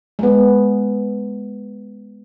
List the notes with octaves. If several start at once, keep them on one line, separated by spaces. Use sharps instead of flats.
G#3 B3